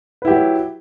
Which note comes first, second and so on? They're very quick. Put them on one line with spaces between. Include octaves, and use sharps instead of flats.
B4 E4 G4 F#3